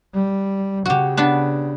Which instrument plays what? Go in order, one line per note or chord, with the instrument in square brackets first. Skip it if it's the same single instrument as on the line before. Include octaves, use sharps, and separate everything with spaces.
[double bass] G3
[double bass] C#3 [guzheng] F#4 G4
[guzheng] B3 D4 B4